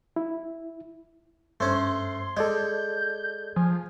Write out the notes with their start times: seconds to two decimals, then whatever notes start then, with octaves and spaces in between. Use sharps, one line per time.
0.16 E4
1.60 G2 A3 C#4 C5 C6
2.37 G#3 A4 D5 D#5 G6
3.56 F3 G#5